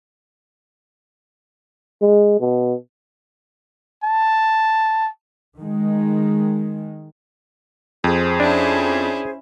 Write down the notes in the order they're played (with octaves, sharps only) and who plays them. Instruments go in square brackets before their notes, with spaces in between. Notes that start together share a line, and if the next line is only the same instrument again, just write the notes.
[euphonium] G#3
B2
[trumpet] A5
[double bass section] D#3 G#3
[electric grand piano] F2 [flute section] G#4 C5
[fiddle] C#4 E4 [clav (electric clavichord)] D4